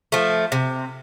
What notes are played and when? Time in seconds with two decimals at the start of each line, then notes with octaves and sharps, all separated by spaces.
0.12 F3 A3
0.52 C3